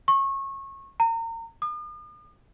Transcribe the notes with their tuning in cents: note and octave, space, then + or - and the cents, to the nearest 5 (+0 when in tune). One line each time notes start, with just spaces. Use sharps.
C#6 -25
A#5 -30
D#6 -45